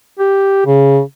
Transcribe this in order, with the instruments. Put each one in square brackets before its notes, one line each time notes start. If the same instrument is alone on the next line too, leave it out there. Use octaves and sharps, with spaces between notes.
[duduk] G4
C#3